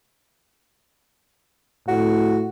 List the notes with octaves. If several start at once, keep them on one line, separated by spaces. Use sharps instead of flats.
A2 F#4